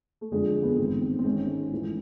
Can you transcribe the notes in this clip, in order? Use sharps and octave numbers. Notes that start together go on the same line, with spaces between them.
A3
G1 F2 D3 G#3
A3
B3
A1 G#2 D#3 C4
C4
C4
G#1 G#2 D#3 C#4
A1 A2 E3